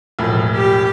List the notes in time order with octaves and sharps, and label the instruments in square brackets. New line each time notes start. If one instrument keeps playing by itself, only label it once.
[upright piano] E1 A2 F3
[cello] G4